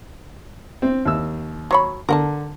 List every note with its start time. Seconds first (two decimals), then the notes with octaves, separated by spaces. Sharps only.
0.82 C4
1.05 D#2 E6
1.71 F#3 C#5 B5
2.09 D3 A#4 F#5 A5